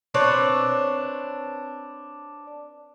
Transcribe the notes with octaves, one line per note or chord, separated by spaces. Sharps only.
C4 D4 B4 C#5